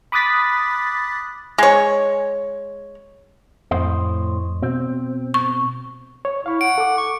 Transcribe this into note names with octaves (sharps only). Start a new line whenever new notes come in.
B5 D6 D#6 F#6 A6 B6
G#3 C#5
F2 A2 C5 D#5
B2 C4
C#6
C#5
E4 F5 C#6
F#5 D7
A4 D6
C#6